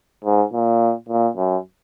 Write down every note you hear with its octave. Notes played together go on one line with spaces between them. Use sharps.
G#2
A#2
A#2
F#2